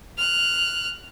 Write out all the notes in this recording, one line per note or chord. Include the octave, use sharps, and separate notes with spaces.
F6 F#6